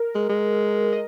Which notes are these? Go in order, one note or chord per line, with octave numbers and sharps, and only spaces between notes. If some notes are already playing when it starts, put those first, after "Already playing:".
Already playing: A#4
G#3
G#3
D#5